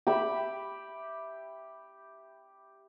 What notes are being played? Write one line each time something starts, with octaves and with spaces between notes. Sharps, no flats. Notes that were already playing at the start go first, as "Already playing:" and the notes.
G4 E5 B5